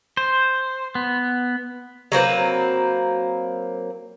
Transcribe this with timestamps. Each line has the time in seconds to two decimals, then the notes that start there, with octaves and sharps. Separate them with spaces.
0.17 C5
0.95 B3
2.12 F#3 A#3 C4 B4